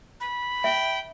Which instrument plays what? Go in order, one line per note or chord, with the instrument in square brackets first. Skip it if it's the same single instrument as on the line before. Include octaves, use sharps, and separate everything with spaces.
[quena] B5
[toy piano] E5 [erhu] G5